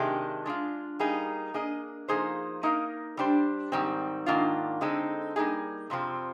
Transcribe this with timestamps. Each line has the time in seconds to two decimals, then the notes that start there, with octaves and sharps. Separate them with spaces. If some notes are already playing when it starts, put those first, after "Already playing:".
Already playing: C3 D#3 G#3 D4 G4
0.46 G#3 D4 F4
0.99 G3 A#3 D#4 G#4
1.54 A#3 D4 G#4 D#5
2.08 F3 A#3 D#4 G#4 C5
2.63 A#3 D#4 A#4 F5
3.17 G3 D4 G4 C5
3.72 G#2 D#3 G3 C4
4.26 G#2 D#3 A#3 D4 F4
4.81 D3 G#3 C4 D#4
5.36 G3 A#3 D#4 G#4
5.90 F2 C3 F3 C4